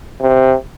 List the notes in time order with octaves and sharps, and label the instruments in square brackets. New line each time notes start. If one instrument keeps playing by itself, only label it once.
[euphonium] C3